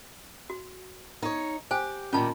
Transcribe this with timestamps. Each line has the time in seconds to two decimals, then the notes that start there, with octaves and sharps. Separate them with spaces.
0.50 F#4
1.23 D#4 C#5
1.71 G4 C5 G#5
2.13 A#2 D#3 G3 C#4 F4 A5